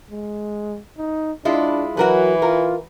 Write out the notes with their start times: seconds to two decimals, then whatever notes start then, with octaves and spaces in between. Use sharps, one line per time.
0.11 G#3
0.98 D#4
1.45 G#3 D4 E4 F4
1.97 E3 F#3 F#4 A#4 B4
2.42 F4 A#4